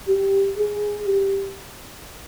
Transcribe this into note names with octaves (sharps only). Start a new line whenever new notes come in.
G4
G#4
G4